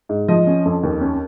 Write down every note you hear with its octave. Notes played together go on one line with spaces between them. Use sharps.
G#2
F3 D#5
C#4
F2
D#2
C#4